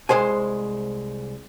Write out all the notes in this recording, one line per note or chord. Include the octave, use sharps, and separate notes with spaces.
C2 C3 G#3 C5 G#5